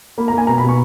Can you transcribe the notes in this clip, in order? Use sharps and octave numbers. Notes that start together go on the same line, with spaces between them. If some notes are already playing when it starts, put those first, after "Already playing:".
A#3 B5
A#3 A#5
G#5
B2 A#5
B5
B2
C#6